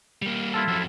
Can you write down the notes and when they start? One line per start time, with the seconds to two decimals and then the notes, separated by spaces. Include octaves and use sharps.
0.22 G3 A#3
0.54 E4 F4 A4
0.68 F2 F#3